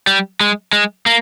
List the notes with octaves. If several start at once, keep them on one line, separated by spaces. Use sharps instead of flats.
G3
G#3
G#3
A#3